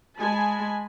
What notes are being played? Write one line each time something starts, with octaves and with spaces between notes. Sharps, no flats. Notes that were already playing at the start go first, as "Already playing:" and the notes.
G#3 G#5 A5 B5